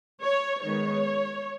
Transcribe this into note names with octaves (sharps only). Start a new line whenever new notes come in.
C#5
D#3 G#3 B3 C#5